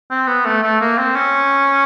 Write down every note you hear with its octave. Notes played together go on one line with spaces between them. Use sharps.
C4
B3
A3
A3
A#3
C4
C#4